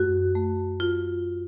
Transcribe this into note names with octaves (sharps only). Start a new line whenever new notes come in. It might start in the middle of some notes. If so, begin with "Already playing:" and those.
Already playing: F#2 A3 F#4
A3
F4